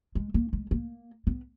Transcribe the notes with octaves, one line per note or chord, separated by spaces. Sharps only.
G#3
A#3
G#3
A#3
B3